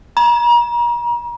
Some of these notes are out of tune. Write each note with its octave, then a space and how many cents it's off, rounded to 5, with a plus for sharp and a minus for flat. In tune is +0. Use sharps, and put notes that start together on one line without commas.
A#5 +40